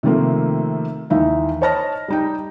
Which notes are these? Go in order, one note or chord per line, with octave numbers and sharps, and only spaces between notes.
C3 D#3 F3 A3 A#3 F4
D#2 E3 D#4 E5 F5
C5 C#5 D#5 A5 F6 A#6
G3 D#4 G5